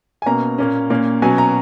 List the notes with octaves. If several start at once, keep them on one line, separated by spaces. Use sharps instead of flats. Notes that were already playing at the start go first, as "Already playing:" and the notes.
G#5
B2 A#3 C#4 A#5
A#2 A#3 C#4
A#2 A#3 C#4
B2 F#3 C#4 G#5
A#5